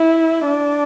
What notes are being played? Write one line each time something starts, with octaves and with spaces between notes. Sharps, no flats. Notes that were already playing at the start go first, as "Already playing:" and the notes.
Already playing: E4
D4